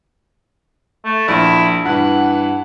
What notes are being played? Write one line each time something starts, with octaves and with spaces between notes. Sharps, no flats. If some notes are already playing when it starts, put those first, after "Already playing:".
A3
A#1 E4
G2 E3 F#5